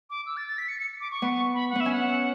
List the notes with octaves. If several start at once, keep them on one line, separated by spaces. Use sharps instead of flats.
D6
E6
A6
A6
B6
C#7
C#7
D6
C#6
B3
B5
F#5
B3 E5
C#4
F#5